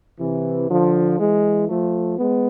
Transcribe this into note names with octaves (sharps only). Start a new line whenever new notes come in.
C3 E3
D3 F3
E3 G#3
F3 A3
G#3 B3